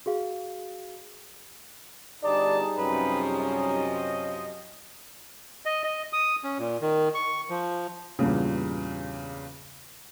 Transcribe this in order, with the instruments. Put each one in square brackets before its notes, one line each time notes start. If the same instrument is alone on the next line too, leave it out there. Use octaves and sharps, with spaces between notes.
[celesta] F#4 G#4 F5
[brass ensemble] G1 D4 A5 [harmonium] G3 D#4 G#4 [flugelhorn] D5
[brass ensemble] F#2 C3 F3 [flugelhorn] C#4 [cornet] B4
[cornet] D#5
[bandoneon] D#5
D#5
D#6
C#4
A#2
D#3
C#6
F3
[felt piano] E2 G2 A#2 C#3